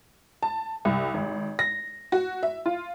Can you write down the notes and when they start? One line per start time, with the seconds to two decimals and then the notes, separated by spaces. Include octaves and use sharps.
0.43 A5
0.85 C2
1.14 G#1
1.59 A#6
2.12 F#4
2.43 E5
2.66 F4